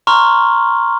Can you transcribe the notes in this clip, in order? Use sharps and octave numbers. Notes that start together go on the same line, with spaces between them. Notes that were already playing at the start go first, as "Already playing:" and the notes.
A#5 C6 C#6 F6